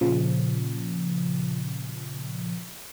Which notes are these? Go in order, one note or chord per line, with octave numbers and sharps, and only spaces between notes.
A#2 C#3 F3